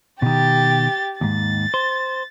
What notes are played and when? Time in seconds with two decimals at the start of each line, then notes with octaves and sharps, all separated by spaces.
0.22 B2 D#3 G4 A6
1.21 D#2 G#2 A6
1.74 C5